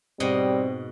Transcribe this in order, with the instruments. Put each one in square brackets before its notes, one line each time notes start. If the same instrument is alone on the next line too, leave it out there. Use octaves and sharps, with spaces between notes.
[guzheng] G#2 B2 D#5 [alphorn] G3 [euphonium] C4